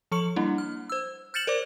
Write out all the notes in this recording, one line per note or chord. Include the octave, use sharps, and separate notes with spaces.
F3 A4 C#6 C#7 F#7
G3 A#3 D4 E4
F6
C5 E6
F6 G6 A6 C#7 E7 F#7
A#4 C5 D5 D6